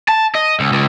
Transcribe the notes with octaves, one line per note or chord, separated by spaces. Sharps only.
A5
D#5
C#2
C#2